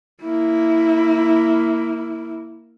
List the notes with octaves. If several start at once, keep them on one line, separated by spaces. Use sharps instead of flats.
A#3 E4